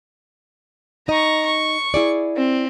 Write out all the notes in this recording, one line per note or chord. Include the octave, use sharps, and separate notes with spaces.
D#4 D#5 A#5 C#6
C#6
E4 G#4 D5
C4